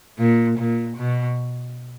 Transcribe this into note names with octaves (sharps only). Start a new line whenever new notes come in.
A#2
A#2
B2